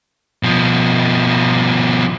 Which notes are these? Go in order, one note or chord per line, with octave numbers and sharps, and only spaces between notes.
B2 F3